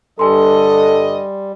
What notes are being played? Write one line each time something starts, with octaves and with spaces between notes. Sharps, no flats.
G2 D3 G3 A4 D#5 G#5 C6